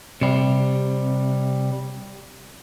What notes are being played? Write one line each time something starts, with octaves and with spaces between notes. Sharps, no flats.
C3 G3